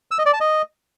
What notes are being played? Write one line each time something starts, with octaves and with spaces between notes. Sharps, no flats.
E6
D#5
D5
A5
D#5